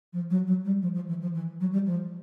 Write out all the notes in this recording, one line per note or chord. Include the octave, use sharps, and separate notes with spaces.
F3
F#3
F#3
G3
F3
F3
E3
F3
E3
F#3
G3
F3